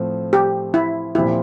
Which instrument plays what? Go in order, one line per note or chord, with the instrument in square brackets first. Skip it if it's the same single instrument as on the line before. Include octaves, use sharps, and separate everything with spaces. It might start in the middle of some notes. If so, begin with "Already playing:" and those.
Already playing: [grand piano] A2 F3 C4
[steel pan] G4
E4
[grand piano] A#2 F3 C4 G4 [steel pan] E4